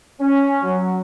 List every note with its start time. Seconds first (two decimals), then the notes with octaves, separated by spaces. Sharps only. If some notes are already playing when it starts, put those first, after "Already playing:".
0.20 C#4
0.63 F#3